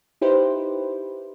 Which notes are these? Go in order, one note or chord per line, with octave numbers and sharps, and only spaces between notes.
D#4 E4 G4 B4 C5